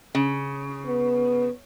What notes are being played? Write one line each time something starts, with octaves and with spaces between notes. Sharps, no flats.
C#3
B3